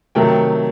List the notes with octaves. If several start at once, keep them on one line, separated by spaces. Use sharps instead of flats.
C3 D#3 F#3 A3 G5